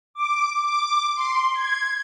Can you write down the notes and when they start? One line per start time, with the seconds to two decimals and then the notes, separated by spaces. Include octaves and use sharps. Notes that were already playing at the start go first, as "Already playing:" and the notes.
0.14 D6
0.65 D6
1.15 C6
1.54 G#6